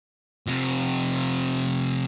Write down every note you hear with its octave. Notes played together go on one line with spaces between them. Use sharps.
F2 C3